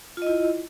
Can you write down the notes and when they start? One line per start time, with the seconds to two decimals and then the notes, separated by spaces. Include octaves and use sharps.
0.17 F4
0.22 D#5
0.27 E4